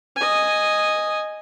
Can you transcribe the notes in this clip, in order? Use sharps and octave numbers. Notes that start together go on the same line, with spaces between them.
D#5 G#5